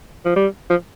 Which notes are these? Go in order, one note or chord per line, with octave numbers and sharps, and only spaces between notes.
F3
G3
F3